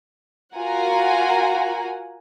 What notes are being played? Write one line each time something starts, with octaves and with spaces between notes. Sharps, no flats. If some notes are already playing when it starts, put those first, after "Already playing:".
F4 F#4 A#4 F#5 G#5 A#5